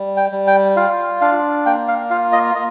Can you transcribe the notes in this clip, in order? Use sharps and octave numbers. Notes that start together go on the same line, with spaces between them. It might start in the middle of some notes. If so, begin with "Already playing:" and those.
Already playing: G3
G5
G3
G5
F4 F5
D4 F5
A#3 G5
F5
F4 F5
D#5
A#3 D#5